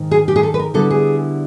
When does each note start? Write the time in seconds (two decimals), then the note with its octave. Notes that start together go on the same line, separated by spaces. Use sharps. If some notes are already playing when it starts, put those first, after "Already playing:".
Already playing: G#2 D#3
0.11 G#4
0.28 G4
0.36 G#4
0.43 A4
0.54 B4
0.59 A#4
0.74 D3 G3 B3 E4 A4
0.90 G#4